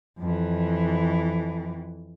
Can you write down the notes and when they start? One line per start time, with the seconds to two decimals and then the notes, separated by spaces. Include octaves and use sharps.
0.19 F2 E3